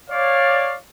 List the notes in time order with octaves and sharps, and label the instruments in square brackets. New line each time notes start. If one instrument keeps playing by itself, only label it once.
[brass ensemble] C#5 D5 F5